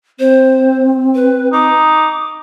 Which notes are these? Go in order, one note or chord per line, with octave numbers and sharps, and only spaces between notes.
C4 C5
B4
D#4 D6